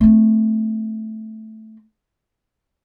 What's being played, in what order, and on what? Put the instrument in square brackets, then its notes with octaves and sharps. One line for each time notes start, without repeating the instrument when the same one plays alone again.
[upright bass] A3 C4